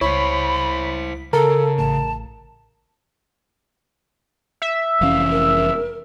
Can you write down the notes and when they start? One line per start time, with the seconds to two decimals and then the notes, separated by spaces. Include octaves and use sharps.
0.01 C#2 E4 C5 C#5 B5 B6
1.33 C#3 A4 A#4 A5
1.78 A1 A2 A5
4.62 E5
5.01 F1 E3 C#4 F5
5.31 A#4